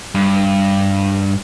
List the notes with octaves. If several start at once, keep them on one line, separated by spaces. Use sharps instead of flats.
G2